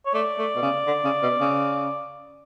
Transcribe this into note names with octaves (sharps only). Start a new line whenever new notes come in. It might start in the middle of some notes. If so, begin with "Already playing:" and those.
C#5
A3 D5
A3
B2
C#3
D3
C#3
B2
C#3